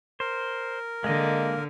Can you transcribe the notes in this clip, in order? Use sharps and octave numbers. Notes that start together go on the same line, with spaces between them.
A#4 C5
D3 G#3 A#3 D#5